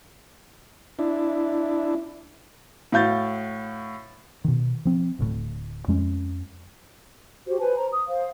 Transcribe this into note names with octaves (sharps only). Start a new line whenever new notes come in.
D4 E4
A2 F#4 F5 G6 A6
B2 D#3
F3 C4
D1 A1 D2 A2
F2 G#3 C#4
F#4 G4 C5
B4 C5 G#5 A5
C5 A#5
D#6
C5 F5